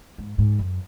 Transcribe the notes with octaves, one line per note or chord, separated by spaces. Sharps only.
G#2
G#2
F#2